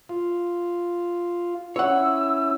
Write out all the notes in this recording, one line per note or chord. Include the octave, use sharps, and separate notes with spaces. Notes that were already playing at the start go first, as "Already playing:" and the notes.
F4
C#4 E4 C#5 F#5 E6